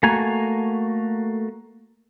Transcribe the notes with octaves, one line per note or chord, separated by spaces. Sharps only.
A3 A#3 F#4 G#5 A#5